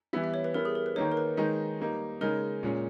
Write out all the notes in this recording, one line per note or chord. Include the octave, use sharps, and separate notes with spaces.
E3 G3 B3 E4 E5
E5
C#5
B4
G3 B3 E4 A#4
G#4
A#4
B4
D#3 A#3 D#4 C#5
A#4
B4
D#3 G#3 D#4
G3 A#3 D#4
C#3 G#3 D#4 A#4
A#2 G#3 C#4